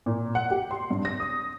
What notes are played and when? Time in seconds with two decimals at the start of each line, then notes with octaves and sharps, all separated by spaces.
0.06 A#2
0.35 F#5
0.50 G4
0.71 C6
0.90 G2
1.05 A#6
1.20 D#6